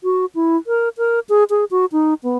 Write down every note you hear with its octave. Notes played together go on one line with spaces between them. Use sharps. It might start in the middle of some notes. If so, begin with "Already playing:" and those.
F#4
E4
A#4
A#4
G#4
G#4
F#4
D#4
B3